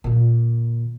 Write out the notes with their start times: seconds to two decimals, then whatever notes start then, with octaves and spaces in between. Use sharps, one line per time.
0.04 A#2 D3